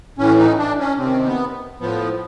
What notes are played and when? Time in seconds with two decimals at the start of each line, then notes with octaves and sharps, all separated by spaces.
0.18 A2 E3 C#4
0.38 D#4
0.59 D4
0.79 C#4
0.99 C3 C4
1.04 D#3
1.26 B3
1.80 A2 F3 B3